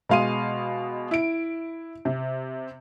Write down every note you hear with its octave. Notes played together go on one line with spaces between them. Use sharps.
B2 G#3 F5 C6 D#7
E4 D7
C3